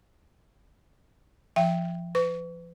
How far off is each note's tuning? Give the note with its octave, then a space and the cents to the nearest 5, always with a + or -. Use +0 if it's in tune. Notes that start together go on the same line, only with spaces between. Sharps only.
F3 -25 E5 +25 G5 +0
B4 +35 C#6 +35